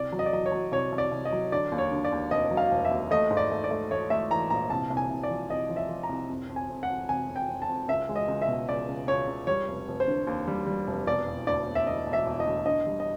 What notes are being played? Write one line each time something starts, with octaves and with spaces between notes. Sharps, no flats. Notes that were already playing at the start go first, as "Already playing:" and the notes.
Already playing: C2 D5
F#3
D#5
D5
F#3 D#5
C#5
F#3
C2 C#5
C2
D5
C2
D#5
F#3
D3 D5
D#2
C#5
D3
D5
D#2
F1 D#5
F#3
F5
F1
E5
D#2
A3 D#5
G#2
D5
A3
D5
A3
A3 C#5
A3 E5
E3 A#5
A#1 A#5
C2 A5
C2
G#5
C2
D5
F3
C2 D#5
F3
E5
F3
A#5
C2
F2
F2
G#5
F2
F#5
F2
C3 G#5
F2
G5
F2
A5
F2
C#2 E5
G#3
D#5
C#2
E5
B2
C#2 D5
C#2
C#2 C#5
C#2
G3 C#5
F1
F1
C5
D3
D#2
G3
G3
F1
E1 D5
E1
D2 D5
E1
E5
D2 D#5
E1
E5
E1
D#5
D2
D3 D#5
G3
D#5